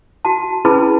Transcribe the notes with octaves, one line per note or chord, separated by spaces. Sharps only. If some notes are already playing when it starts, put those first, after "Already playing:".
F#4 A5
C#4 E4 G#4 B4 A5 B5